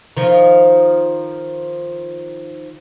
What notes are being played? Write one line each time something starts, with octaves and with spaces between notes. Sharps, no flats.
D#3 F3